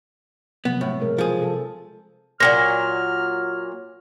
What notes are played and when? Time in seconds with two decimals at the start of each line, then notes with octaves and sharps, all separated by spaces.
0.65 C3 F3 F#3 B3
0.81 A2
0.98 B2 G#3 A#4
1.18 F3 G#4
1.39 C3 A4
2.40 A#2 E3 F#3 F6 A#6